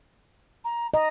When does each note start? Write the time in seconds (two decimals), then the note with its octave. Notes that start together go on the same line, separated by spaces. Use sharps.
0.64 A#5
0.94 D#5 A#5